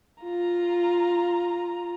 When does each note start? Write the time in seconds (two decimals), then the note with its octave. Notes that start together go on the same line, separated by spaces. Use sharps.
0.24 F4 A#5